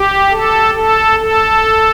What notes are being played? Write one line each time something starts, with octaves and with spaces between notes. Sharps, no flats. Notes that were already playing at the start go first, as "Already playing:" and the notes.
Already playing: G4
A4
A4
A4